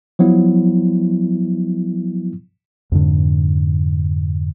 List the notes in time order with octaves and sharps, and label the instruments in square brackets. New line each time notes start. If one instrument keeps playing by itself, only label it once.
[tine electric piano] F3 F#3 B3 E4
[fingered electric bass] F2 G#2 D3